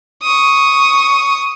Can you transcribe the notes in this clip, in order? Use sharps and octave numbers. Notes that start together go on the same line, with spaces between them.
C#6 D#6